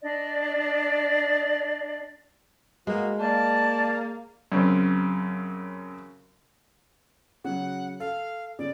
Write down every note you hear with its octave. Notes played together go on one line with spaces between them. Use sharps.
D4 D5 D#5
G#3 A#3 B3 F#4
A#3 D5 A5
F#2 C#3 C4
C#3 F#3 F#5
A4 F5
C#3 D5